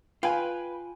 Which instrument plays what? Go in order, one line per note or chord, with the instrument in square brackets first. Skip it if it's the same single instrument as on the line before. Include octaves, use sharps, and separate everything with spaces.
[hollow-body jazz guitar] F4 [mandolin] B4 [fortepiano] G5 G#5